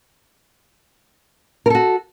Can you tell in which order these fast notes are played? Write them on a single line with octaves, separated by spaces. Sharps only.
A#4 A4 F#4